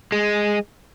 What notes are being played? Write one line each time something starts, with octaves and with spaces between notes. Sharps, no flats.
G#3